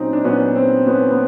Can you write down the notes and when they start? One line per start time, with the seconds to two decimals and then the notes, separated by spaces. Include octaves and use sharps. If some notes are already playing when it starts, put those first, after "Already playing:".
Already playing: A#2 F#3 C4 C#4 D#4
0.13 D4
0.24 A#2 F#3 B3 C#4
0.56 C4
0.87 B3 C#4
1.10 B3